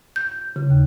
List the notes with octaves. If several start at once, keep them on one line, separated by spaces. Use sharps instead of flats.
G6
C#3
D#2